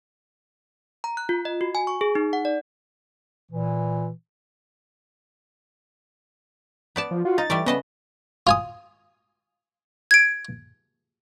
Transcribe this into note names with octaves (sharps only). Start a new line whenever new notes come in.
A#5
F#6
F4
D#5
F#4
G#5
C#6
G#4
D#4
F#5
D5
A#2 E3
B3 D5 A5
F3
F4 F#4
D#4 A6
E3 G3 A3 D5
C#3 B3 B4 D#5 A5
F4 G#5 D#6
G#6 D7